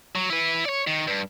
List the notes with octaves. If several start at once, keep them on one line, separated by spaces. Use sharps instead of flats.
F#3
E4 B4
C#5 D5
D#3
G2